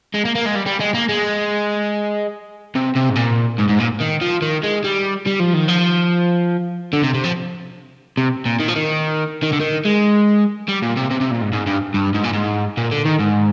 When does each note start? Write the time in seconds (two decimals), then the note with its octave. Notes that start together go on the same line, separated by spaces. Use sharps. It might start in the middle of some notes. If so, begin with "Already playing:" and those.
0.14 G#3
0.25 A#3
0.35 A#3
0.46 G#3
0.56 G3
0.67 G3
0.80 G#3
0.94 A#3
1.09 G#3
2.75 C3
2.96 C3
3.10 G#2
3.16 A#2
3.59 G#2
3.70 G#2
3.80 A#2
4.01 D#3
4.22 F3
4.42 D#3
4.63 G#3
4.84 G3
5.26 G3
5.40 F3
5.53 D#3
5.68 F3
6.93 D3
7.03 C3
7.14 C3
7.24 F3
8.17 C3
8.46 A#2
8.60 D#3
8.68 F3
8.76 D#3
9.43 D#3
9.53 D3
9.61 D#3
9.85 G#3
10.68 G3
10.82 A#2
10.96 C3
11.10 C3
11.20 C3
11.31 A#2
11.41 G#2
11.53 G#2
11.66 G2
11.94 G2
12.15 G#2
12.24 A#2
12.34 G#2
12.77 A#2
12.91 D3
13.05 D#3
13.19 G#2